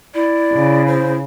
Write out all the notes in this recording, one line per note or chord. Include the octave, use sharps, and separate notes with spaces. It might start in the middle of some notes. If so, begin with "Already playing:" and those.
E4 D5
C#3
C5